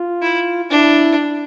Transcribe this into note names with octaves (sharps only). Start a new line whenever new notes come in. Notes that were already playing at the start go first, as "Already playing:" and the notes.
Already playing: F4
E4
D4 E4